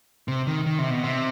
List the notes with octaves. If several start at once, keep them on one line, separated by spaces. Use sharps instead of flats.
C3
D#3
D#3
C3
B2
C3